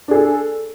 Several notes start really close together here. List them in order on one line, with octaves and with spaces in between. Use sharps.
D4 G#4 A4